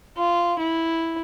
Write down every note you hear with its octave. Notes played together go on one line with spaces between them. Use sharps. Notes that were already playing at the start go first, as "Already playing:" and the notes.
F4
E4